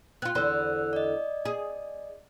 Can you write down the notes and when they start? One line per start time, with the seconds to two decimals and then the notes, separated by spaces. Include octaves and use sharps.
0.22 C4 F4 F#6
0.35 E2 D3 C5 E6 F#6
0.93 D5 D#5
1.45 G#4